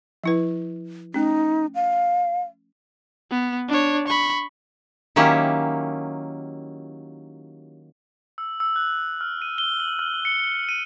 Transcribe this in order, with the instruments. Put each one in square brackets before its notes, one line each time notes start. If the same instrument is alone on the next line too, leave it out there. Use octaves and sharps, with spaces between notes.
[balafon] F3 E4 B4
[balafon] A3 C#4 [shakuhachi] D#4
[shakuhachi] F5
[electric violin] B3
D4 C#5
B5 C#6
[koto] D#3 F#3 A#3 C#4 E4 G4
[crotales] E6
E6
F#6
F6
D#7
G7
F#7
F6
C#7
D#7